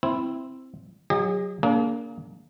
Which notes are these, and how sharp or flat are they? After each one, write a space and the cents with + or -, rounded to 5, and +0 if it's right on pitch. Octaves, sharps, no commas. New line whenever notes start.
C4 +0 E4 +0
F#3 +0 G#4 -45 D#5 +0
A#3 +0 D4 -30 G#4 +30